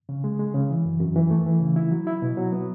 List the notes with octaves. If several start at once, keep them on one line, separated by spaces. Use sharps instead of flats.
C#3
G#3
G#3
C#3
E3
F#2
F#2
E3
A3
E3
C#3
E4
F#3
E4
B2
F#3
B3